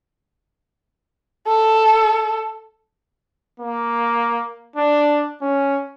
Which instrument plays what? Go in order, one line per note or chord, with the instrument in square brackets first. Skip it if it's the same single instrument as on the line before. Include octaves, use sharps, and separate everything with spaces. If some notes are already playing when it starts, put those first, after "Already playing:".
[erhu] A4
[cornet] A#3
D4
C#4